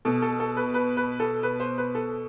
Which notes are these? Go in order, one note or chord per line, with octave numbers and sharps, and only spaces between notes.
B2 A4
A4
A4
B4
B4
B4
A4
B4
C5
B4
A4